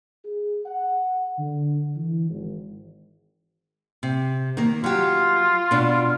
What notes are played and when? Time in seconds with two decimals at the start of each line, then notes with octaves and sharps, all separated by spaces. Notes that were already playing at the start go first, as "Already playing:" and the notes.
0.25 G#4
0.66 F#5
1.38 D3
1.96 E3
2.30 G#1
4.03 C3
4.57 D#3 A#3
4.84 F#3 F4 G4
5.71 B2 D4